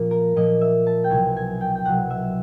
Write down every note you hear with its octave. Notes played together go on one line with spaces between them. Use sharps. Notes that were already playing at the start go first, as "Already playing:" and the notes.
Already playing: A#2 F3 A#3
A#4
A#2 F3 A#3 D#5
E5
A5
G5
C2 B2 F#3 G#5
G#5
G5
G5
C2 B2 F#3 F#5
E5